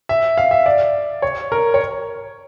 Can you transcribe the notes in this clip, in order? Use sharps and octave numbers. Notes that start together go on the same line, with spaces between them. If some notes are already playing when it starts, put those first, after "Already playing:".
E5
F5
E5
D5
C#5
A#4
C#5